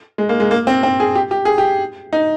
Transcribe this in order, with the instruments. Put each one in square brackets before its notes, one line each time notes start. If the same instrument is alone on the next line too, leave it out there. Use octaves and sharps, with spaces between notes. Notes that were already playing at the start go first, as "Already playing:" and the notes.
[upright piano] G#3
A#3
G#3
A#3
C4
C4
G#4
G4
G4
G#4
G4
D#4